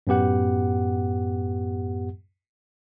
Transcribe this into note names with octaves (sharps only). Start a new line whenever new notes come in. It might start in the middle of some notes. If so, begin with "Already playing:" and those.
F#2 A2 B3 G4 F#5